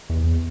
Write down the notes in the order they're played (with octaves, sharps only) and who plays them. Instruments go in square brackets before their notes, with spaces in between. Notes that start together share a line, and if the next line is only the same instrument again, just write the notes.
[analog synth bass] E2